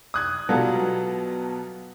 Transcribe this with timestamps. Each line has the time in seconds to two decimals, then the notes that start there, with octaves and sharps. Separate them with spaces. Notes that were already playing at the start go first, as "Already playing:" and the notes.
0.14 D#6 F#6 G#6
0.49 B2 F#3 G3 B3 F4 A4